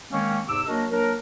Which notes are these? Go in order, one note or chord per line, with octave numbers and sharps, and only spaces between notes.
D#3 G#3 A#3 C4 C#4
E2 G#2 C3 D6 E6
F#3 A#3 D4 F#4 A#4 D#5
F#3 A#3 D4 A#4